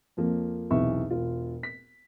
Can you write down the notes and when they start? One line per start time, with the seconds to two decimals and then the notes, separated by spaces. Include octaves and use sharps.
0.17 F2 F3 A#3
0.71 B1 E2 C3 E3 E5 C#6
1.10 E1 F4
1.63 B6